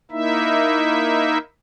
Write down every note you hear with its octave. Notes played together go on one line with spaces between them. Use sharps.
A#3 D#4 E4 E5